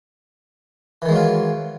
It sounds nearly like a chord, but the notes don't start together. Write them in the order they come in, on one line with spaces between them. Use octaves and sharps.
E3 D#3 G#3 F#3 F4